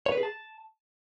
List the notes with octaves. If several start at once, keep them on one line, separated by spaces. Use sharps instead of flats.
C#5
B4
G#4
A5